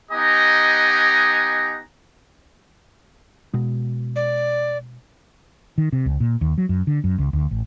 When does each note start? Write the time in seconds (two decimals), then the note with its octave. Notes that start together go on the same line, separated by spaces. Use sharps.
0.12 B3 D#4 G4 D#5 G#5 A#5
3.54 B2 G#3
4.16 D5
5.78 D#3
5.93 C3
6.06 C#2
6.20 A#2
6.41 D#2
6.58 F#3
6.69 F#2
6.87 D3
7.04 F#2
7.19 C#2
7.33 D2
7.51 A1